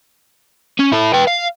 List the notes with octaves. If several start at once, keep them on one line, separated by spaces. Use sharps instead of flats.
C#4
E4 A4
B4 G5
F5